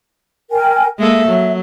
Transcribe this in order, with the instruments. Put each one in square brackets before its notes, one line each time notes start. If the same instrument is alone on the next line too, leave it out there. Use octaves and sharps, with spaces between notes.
[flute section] A#4 G5 G#5
[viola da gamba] G#3 A#3 A4 [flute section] E5
[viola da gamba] F#3